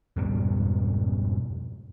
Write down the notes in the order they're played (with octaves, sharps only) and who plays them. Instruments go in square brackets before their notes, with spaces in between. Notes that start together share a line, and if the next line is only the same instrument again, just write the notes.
[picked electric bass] F2 G#2 B2 G3